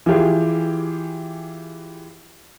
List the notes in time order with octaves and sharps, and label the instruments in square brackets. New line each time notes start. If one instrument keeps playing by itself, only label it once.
[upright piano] E3 F4 G4 G#4